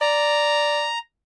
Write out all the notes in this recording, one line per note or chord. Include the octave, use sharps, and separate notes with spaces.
D5 A#5